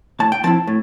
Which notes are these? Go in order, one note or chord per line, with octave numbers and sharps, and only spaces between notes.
A2 A5
G5
F3 C4 E4 A5
A2